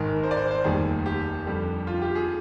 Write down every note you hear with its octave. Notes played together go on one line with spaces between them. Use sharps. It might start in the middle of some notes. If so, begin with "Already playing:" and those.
Already playing: G#1 G#2 D#3 G#3 A#4
C5
D5
C5
C5
F1 D#2 D#3 G3 G#4
G4
F2 D3 G3
F4
G4
G#4